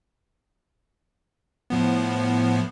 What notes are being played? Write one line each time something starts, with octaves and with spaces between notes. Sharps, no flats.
A2 F3 B3